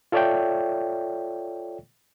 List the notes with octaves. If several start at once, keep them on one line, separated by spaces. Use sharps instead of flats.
F4 A4 C#5 D5 E5 G5